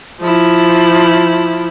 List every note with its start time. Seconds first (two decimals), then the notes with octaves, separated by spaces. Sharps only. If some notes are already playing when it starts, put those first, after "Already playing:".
0.21 F3 E4